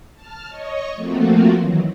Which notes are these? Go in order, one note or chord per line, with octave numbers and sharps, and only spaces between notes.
A5 F6
C#5 D#5 C#6
F3 A3 A#3 C4 F4 F#4
D#3 E3 F#3